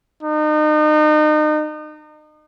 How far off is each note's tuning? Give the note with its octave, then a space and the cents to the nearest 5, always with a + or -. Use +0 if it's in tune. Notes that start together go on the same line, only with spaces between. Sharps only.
D#4 -35